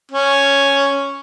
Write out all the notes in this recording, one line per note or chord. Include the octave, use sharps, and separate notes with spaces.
C#4